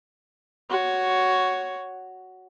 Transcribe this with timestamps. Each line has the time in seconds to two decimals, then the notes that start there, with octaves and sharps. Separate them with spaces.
0.70 F#4 C#5